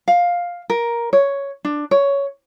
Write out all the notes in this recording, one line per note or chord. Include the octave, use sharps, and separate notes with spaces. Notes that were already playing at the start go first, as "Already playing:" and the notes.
F5
A#4
C#5
D4
C#5